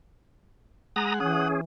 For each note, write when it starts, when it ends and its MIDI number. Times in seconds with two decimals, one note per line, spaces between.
0.96 1.19 56
0.96 1.19 78
0.96 1.14 82
0.96 1.14 87
1.20 1.63 52
1.20 1.61 61
1.20 1.61 68
1.20 1.48 78
1.20 1.48 87